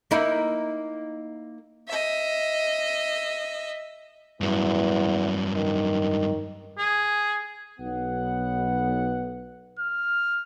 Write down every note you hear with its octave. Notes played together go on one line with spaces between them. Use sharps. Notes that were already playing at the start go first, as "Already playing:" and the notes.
A#3 D#4 E4
D#5 E5
E2 G2 F#3
D#3
G#4
B1 B3 F#5
F6